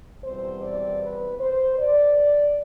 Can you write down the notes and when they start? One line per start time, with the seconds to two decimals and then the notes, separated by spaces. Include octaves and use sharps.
0.23 E2 B2 G3 C4 C5
0.62 D5
1.01 B4
1.40 C5
1.79 D5